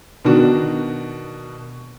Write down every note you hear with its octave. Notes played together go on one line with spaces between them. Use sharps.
B2 D#3 D4 F#4